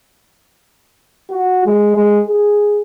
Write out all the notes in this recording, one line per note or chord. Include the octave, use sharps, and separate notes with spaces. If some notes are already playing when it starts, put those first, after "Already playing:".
F#4
G#3
G#3
G#4